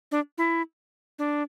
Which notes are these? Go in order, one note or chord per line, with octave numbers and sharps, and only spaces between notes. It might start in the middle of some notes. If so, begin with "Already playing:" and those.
D4
E4
D4